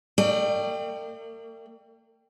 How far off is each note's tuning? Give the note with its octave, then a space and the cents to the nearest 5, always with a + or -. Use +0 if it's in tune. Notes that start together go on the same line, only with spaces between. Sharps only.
A#3 -45 D5 +40 G5 +0